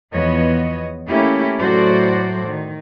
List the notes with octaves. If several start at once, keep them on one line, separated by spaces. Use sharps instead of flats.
E2 F3 B3 C#5 D#5
A3 A#3 C#4 E4 G4
A2 F#3 F#4 A4 C5 D5
D#3